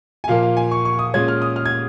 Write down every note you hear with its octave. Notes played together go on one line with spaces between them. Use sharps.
G#5
A#2 F3 A#3 F5
F5
G#5
C#6
C#6
D#6
A#2 G#3 C#4 G#6
F6
D#6
F6
G#6